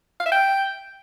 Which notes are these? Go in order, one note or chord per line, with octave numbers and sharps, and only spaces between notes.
F5
E5
G5